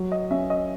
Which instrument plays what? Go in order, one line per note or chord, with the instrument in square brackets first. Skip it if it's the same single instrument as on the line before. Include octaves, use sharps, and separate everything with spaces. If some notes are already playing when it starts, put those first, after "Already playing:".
Already playing: [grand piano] F#3
[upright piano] D#5
[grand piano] C#4 [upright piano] E5
[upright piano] D#5